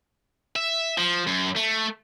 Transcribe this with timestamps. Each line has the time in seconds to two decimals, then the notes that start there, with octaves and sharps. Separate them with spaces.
0.56 E5
0.98 F3
1.27 F#2
1.56 A3